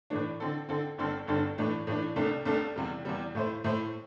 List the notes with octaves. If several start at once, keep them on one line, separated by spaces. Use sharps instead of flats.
A2 E3 A3 D4
D3 C4 A4
D3 C4 A4
G1 G2 D3 C4 A4
G1 G2 D3 C4 A4
A2 E3 A3 D4
A2 E3 A3 D4
C2 C3 A3 D4 A4
C2 C3 A3 D4 A4
E2 C3 G3
E2 C3 G3
A2 A3 E4 C5
A2 A3 E4 C5